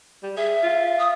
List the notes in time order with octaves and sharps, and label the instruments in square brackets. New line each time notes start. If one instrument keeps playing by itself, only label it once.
[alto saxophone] G3
[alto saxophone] G#4 [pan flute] E5
[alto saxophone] F4
[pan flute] D#6